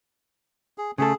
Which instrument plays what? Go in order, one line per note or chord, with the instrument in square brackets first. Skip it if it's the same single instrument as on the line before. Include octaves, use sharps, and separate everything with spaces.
[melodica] G#4
[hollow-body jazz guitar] C#3 A3 A4 [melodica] G#4